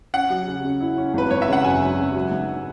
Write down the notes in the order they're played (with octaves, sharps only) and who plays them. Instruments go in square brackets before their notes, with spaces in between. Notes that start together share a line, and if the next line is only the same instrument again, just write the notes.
[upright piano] C#4 [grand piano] F#5
[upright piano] F#3
C#3
C#3
E4
C#4
[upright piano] G#1 [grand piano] B4
[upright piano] G#1 [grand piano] C#5
[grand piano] E5
[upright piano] C#3 [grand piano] F#5
[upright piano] F#2 [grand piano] G#5
[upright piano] F#2
C#3
F#3
G#2